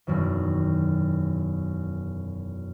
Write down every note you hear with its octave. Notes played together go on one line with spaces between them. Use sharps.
E1 F#2 D#3